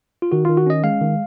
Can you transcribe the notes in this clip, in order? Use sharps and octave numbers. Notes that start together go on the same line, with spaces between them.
F4
D#3 F#4
D#3 F4
F#4
C#4 D#5
G#3 F5
D#3